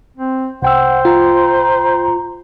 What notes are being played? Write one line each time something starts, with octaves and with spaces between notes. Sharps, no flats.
C4
C2 C5 F#5 G5 E6
F4 A#5